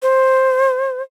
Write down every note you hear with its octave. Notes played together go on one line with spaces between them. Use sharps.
C5